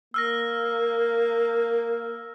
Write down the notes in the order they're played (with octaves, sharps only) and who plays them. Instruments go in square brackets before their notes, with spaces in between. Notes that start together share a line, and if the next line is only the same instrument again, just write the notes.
[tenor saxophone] A#3 [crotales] E6 F6 A#6